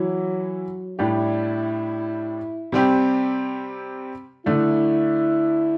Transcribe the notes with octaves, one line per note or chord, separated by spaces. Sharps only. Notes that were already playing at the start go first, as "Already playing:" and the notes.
Already playing: E3 F#3 E4
A2 G3 D4 E4 G4
C3 G3 C4 G4
D3 A3 D4 E4